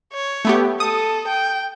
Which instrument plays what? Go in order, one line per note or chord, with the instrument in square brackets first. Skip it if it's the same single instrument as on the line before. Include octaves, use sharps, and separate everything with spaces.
[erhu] C#5
[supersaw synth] A3 B3 G4
[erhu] A4 [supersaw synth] D#6
[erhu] G5